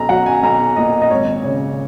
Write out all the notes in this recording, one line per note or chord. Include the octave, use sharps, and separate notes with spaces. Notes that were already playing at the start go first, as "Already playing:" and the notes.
Already playing: B1 A#5
F#3 F#5
G#5
B1 A#5
A#2 D#5
D#5
G#1 C#5
C#3 C#5